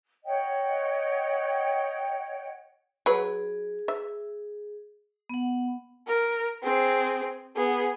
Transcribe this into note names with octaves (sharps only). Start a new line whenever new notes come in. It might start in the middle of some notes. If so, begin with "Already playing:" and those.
C#5 D#5 F#5 G5
F#3 G#4 B4
E5
B3 F#5
A#4
C4 G#4
B3 G#4